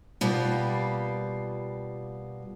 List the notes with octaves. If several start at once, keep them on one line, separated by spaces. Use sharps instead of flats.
B2 G3 A#3 F4